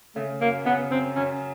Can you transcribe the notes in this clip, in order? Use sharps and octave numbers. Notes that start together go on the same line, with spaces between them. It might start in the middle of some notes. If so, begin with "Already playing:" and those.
C#3 A3
F#2 A#3
C#3 B3
F#2 C4
F#2 C#4